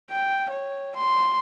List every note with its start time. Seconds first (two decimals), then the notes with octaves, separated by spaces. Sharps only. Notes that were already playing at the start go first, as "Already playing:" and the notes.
0.11 G5
0.51 C#5
0.96 C6